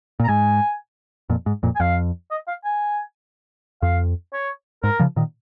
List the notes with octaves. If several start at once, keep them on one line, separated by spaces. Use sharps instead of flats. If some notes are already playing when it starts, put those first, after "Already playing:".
A#2
A#5
G#2 G#5
F2 A#2
G#2
F2 A#2
G#5
F2 F5
D#5
F5
G#5
F2 F5
C#5
G#2 A#4
C#3 F3
A#2 D#3